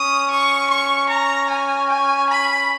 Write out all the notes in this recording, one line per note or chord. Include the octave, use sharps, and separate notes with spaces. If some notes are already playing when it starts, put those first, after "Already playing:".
Already playing: C#4 D#6
C#6
C#6
A#5
G#5
G#5
B5